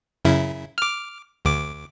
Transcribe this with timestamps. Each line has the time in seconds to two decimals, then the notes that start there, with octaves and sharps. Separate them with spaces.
0.25 F#2 C#3 E4
0.78 D6 F6
1.45 D2 D6